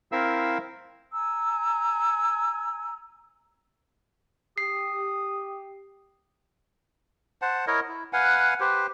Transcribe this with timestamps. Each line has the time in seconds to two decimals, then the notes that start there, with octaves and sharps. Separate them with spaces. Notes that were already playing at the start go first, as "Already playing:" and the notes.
0.12 C4 E4 A#4 E5 F5 E6
1.11 G#5 A#5 E6
4.58 G4 D#6 C7
7.42 C5 F#5 A5
7.67 E4 A#4 C#5 D#5
7.88 E4
8.13 B4 F5 F#5 G#5
8.60 G4 B4 C5